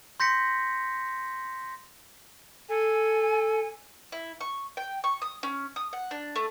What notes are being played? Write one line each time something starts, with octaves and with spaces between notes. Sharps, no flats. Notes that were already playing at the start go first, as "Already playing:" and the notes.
C6 G6 A#6 B6 C#7
A4 G#5
E4
C#6
G5
C#6
D#6
C#4
D#6
F#5
D4
A3